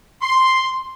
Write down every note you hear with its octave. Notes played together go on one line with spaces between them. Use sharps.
C6